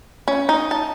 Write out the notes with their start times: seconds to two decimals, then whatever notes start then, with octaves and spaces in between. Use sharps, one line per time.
0.28 C#4
0.49 D#4
0.71 A5